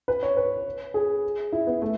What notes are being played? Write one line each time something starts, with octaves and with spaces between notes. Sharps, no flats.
B4
C#5
B4
G#4
E4
B3
A3